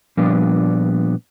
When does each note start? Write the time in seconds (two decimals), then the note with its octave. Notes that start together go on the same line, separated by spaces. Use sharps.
0.17 A#2 F3 G3 B3 D4